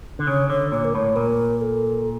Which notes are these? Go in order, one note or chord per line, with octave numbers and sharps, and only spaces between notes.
D3
C#3 C#5
D3 C#5
A#2 C#5
A#4
A2 C#5
A#2 A#4
A4